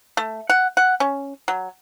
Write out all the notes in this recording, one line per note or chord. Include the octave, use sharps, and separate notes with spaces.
A3
F#5
F#5
C#4
F#3